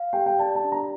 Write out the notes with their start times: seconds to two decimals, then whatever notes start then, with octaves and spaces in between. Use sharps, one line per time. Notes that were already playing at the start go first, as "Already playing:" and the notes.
Already playing: F5
0.13 G4 G5
0.26 G5
0.39 D5 A5
0.55 A5
0.64 D4
0.72 A#5